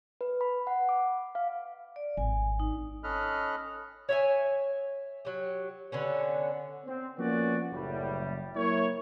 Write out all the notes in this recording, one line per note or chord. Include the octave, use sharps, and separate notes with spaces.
B4
B5
F#5
D6
F5
D5
G#1 G#5
D#4
C#4 A4 D#5 B5 F6 F#6
C#5 E5 G#5
F#3 G4
D3 B3 C#4
C4
F3 A#3 B3 C#4 F#4 D5
F#1 A2 G3
F#3 A#3 E4 A#4 C#5